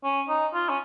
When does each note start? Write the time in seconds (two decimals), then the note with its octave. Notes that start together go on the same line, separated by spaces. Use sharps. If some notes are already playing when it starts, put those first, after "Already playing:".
0.04 C#4
0.29 D#4
0.54 F4
0.69 C#4